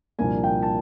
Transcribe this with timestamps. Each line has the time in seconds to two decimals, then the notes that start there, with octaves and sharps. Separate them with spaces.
0.18 C2 A#2 F3 A#3 D4 G#5
0.44 G5
0.62 A5